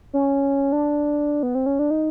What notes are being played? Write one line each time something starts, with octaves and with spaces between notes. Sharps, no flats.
C#4
D4
B3
C4
C#4
D4
D#4